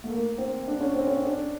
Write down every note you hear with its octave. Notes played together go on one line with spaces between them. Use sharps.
A3
A#3
C4
D4
C#4
C4
C#4
D4